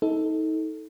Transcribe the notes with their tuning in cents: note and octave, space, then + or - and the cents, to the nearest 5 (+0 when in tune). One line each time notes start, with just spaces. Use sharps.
D#4 +30 A4 +0